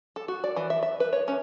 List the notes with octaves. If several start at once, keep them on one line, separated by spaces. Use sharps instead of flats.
A4
F#4
D5
E3
E5
E5
B4
C#5
C#4